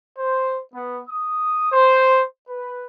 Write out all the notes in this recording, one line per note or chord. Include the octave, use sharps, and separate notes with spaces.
C5
B3
D#6
C5
B4